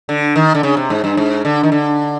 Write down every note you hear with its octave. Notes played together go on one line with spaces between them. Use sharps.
D3
D#3
D3
C#3
C3
G#2
G2
G#2
D3
D#3
D3